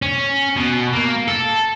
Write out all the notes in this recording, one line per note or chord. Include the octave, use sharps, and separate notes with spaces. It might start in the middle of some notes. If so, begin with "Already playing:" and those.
C#4
B2
A#3
A4